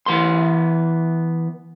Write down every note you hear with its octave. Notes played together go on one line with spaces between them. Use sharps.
E3 B3 C6